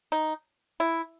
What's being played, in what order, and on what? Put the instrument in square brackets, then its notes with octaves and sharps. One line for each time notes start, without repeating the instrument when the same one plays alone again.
[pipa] D#4
E4